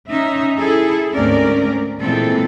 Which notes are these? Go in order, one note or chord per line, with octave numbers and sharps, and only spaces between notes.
C#4 D#4 E5
E4 G#4 A4
D2 G#2 C4 C#4 A#4 D5
A#2 E3 G#3 C4 A4